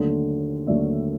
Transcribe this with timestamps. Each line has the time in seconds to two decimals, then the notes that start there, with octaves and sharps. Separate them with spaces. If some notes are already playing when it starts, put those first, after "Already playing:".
Already playing: D#2 D3 F#3 A3
0.67 D#2 D3 F#3 A3 D5 E5